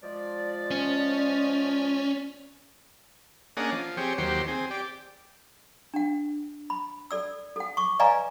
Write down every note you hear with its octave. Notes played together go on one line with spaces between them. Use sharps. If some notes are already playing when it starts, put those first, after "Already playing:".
F3 G#3 D5
C#4
A#3 C#4 D4 G#4 D#5 F#5
F3
C4 G4 G#4 C#5
D#2 F#3 G4 C5
C4 G#4
G4 D5
D4 F#5
B5
A4 D5 E6
A4 F#5
C#6 D6
B4 D5 D#5 F5 G#5 A#5